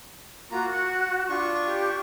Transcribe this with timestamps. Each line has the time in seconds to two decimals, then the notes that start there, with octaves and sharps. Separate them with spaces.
0.51 A#3 F4 F#4 A#5
0.73 F#5
1.29 D4 F4 C#6
1.65 G4